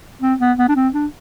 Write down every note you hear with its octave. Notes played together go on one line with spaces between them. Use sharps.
C4
B3
B3
D4
C4
D4